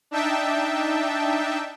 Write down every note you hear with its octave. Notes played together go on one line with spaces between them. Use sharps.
D4 D#4 E5 G5 A5